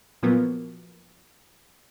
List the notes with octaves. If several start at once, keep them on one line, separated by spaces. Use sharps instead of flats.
A#2 F3 F#3 A#3 B3